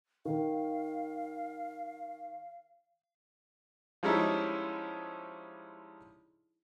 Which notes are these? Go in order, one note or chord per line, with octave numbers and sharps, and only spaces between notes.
D#3 F5
F3 G3 G#3 C#4 D#4 E4